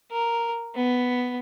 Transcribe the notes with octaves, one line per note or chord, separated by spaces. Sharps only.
A#4
B3